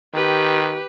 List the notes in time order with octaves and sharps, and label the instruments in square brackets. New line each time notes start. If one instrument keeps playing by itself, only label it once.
[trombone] D#3 [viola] G4 B4